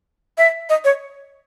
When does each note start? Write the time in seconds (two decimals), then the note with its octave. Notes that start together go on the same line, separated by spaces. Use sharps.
0.38 E5
0.69 D#5
0.84 C#5